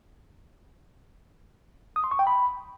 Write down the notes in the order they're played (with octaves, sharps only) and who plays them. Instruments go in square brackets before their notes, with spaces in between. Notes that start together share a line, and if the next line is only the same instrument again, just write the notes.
[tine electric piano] D#6
C6
C#6
G5
B5